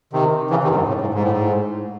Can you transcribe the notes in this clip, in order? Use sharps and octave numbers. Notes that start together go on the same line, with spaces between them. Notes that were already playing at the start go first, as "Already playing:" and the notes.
C3 D#3
C#3 E3
C3 D#3
F#2
G#2
A2
G#2
G#2
A2
G#2